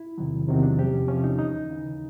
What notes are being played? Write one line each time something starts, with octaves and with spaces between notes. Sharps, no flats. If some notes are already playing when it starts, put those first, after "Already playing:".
Already playing: E4
E2 C3 D#3 F#3
E2 C3 D#3 F#3
D4
E2 C3 F3 G4
C#4
E2 C3 F3 C#4
D#4
D#2 C#3 E3 D#4
D#2 C#3 E3